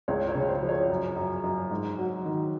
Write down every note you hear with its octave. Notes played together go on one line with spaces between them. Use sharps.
C#2 C#5
C#5
C#3
C5
F3
C#5
F#2
F#2
F#2
G#2
F#3
D#3